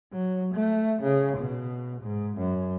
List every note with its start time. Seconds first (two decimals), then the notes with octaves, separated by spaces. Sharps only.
0.12 F#3
0.54 A3
1.02 C#3
1.37 B2
2.01 G#2
2.38 F#2